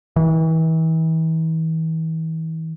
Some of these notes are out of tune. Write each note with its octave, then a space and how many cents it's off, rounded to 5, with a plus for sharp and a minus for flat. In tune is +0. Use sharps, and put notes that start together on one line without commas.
E3 -40